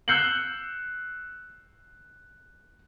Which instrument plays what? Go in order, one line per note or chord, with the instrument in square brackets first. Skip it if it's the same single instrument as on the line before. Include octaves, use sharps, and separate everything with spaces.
[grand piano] E6 F#6 G6 C7 C#7 F#7